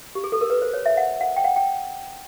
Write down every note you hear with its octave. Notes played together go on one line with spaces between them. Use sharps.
G4
G#4
A4
A#4
B4
C5
C#5
E5
F#5
F#5
G5
F#5
G5